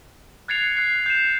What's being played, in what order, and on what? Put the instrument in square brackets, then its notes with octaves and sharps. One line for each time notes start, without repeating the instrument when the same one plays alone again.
[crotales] F#6 G#6 A6 C7 C#7 F7
F#6 C7
G6 C7 E7